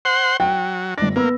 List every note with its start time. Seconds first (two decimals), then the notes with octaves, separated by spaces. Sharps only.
0.05 C5 F#5 C6
0.40 F#3 G5
0.98 G1 D4 A#6
1.16 A#3 B3 E6